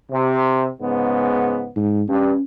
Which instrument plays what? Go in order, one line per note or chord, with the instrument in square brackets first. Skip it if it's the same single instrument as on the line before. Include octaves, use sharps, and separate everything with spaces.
[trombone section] C3
G#2 C#3 B3
[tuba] G#2
[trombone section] G2 [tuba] C#4